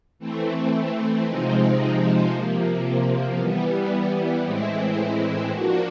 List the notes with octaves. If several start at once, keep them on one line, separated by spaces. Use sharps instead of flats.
E3 A3 C4
C3 F3 G#3 C4 D#4
C3 F3 A#3
E3 G3 B3
A2 E3 G#3 C4 E4
F3 A#3 D4 F#4